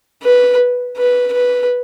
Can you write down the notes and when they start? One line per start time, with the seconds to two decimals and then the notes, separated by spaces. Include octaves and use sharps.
0.23 B4
0.97 B4
1.33 B4